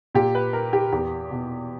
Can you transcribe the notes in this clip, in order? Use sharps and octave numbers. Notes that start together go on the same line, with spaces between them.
A#2 G4
B4
A#4
G4
E2 G4
B2